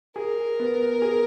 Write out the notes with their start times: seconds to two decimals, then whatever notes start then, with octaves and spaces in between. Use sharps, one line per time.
0.16 G#4 A#4
0.60 B3
1.02 G#4